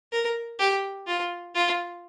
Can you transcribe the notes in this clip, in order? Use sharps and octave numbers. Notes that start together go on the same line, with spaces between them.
A#4
G4
F4
F4